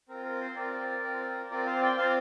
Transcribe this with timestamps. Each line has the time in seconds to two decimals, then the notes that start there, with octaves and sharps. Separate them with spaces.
0.09 C4 F4 A#4
0.25 A#4
0.41 C5
0.56 C4 F4 A#4 D5
1.03 C4 F4
1.50 C4 F4 A#4 D5
1.66 C5 F5
1.82 D5 G5
1.98 C4 F4 C5 F5